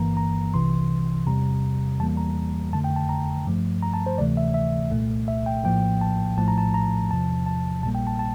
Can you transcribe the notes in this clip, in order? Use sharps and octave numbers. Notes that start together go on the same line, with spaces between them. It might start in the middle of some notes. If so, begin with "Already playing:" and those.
Already playing: G1 G2 E3 A#3 A#5
A#5
C2 C3 E3 C6
E2 C3 G3 A#5
E2 E3 G3 A#3 A5
A#5
F2 D3 A3 A5
G5
A5
A#5
G2 F3 A3
A#5
A5
C5
D2 C3 E3 A3 D5
E5
E5
C2 A#2 A3
E5
G5
A#1 A2 F3 A#3 G5
A5
A#1 A2 F3 A3 A5
A#5
A5
A#5
E2 C3 F3 A5
A5
A#1 A#2 G3 A#3 A5
G5
A5
A5